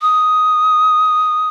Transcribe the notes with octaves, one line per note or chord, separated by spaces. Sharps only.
D#6